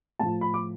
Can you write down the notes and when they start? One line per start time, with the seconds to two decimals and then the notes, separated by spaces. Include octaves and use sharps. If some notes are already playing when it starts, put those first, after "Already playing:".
0.19 A2 F3 A5
0.41 B5
0.54 D6